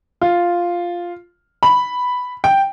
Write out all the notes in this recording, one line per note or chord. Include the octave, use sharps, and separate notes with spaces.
F4
B5
G5